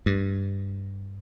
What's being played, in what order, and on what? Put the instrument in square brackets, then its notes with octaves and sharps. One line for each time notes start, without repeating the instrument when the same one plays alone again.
[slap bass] G2